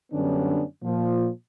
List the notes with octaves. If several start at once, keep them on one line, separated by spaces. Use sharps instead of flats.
F#2 D3 G3 B3 C#4 D4
A#2 F3